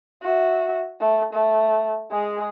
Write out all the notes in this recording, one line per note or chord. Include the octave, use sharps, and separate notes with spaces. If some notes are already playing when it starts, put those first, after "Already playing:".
F#4 E5
A3
A3
G#3 G#4